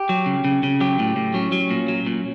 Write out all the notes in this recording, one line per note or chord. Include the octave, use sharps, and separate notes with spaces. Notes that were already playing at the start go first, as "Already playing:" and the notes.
Already playing: G4
F#3
C#3
C#3
C#3
F#3 G4
A2
A2
F#3 C#4
F#3
A#2
F#3
A#2